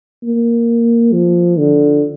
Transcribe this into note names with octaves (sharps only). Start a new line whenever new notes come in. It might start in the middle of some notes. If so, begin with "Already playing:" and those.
A#3
F3
D3